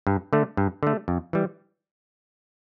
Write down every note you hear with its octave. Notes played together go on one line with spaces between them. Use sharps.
G2
D3 A3
G2
D3 A3
F2
E3 G3